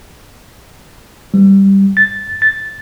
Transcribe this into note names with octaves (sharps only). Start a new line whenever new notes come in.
G3
A6
A6